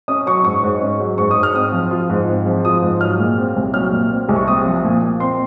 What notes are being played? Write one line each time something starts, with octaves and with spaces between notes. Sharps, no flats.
C#4 D#6
F#3 C#6
G#2 C#6
G#2
C#4
F#3
G#2 C#6
D#6
G#2
F6
C4 D#6
F3
F4
G#2
C4
F3
F4 D#6
G#2
F#3 F6
A#2
C4
C2
F#3 F6
A#2
C4
C2
C#6
C4 D#6
F3
A#2
A#2
C4 C6